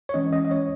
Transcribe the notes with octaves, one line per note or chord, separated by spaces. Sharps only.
C#5
E3 G#3 C#4 D#5
D#5
D#5
C#5